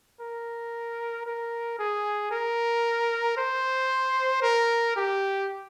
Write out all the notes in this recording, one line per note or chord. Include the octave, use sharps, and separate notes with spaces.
A#4
A#4
G#4
A#4
C5
A#4
G4